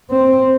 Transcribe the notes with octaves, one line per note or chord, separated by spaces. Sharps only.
C4